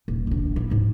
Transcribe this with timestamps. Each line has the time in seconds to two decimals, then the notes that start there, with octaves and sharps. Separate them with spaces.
0.08 D#1
0.27 A#1 D3
0.56 E4
0.70 D2 G#2